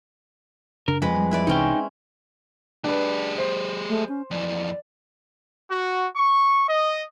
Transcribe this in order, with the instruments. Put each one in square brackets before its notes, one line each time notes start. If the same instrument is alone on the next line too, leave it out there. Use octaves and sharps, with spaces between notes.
[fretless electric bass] F#2 C#3 D4 [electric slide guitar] A#4
[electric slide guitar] F2 [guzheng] G#3 B4 B5
[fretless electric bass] G3
[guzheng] E4 B4 D5
[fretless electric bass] C2 C3 E3 [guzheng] C4 C#4 [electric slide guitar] D#4 G5
[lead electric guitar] G#3 G4 [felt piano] D4 B4
[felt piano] C5
[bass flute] A3
C#4
[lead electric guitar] F2 E3 [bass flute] D5
[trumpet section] F#4
C#6
D#5